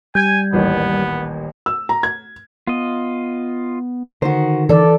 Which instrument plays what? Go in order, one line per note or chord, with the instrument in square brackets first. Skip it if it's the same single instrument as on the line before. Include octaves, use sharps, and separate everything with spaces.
[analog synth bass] G3 [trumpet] G#5 [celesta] G6 G#6
[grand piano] D#1 A1 D#2 [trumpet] B3
[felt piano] E6
A#5
G#6
[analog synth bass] B3 [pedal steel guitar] F4 D#5
[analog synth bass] D3 [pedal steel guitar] D#3 [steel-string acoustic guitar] F#4 C5
[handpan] E3 D5 [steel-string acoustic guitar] A4